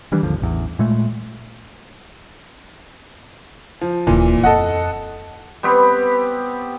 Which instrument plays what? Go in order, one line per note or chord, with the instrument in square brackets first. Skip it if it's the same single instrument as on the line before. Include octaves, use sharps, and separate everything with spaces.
[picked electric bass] D#3 E3 G3 D4
G#1 D#2 D3 F3
A1 E2
A#2 G#3 A3
[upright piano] F3
[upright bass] D#1 G#1 [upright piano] A#2 E3
[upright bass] F2 B3 [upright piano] A4 D#5 F#5
[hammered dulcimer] G3 B3 C4 G4